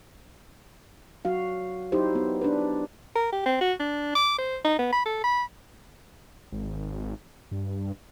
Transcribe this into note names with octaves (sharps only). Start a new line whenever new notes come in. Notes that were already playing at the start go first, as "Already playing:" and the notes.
F#3 F#4 F5
F#3 D#4 E4 G4 C5
B3
D4 B4
A#4
G4
C4
F#4
D4
D6
C5
D#4
B3
B5
A4
B5
G#1
G2